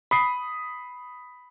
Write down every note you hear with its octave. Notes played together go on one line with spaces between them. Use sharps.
B5 D#6 C7